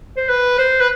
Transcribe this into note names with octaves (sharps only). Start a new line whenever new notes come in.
C5
B4
C5
B4